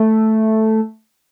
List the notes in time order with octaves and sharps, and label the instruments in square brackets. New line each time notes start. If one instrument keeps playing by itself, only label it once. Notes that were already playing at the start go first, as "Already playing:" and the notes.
Already playing: [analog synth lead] A3